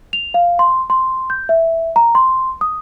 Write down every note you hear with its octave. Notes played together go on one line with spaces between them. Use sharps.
F7
F5
C6
C6
G6
E5
A#5
C6
D#6